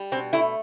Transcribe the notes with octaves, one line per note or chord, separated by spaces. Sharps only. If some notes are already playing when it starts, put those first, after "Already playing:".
Already playing: G3
B2 C4
A3 E4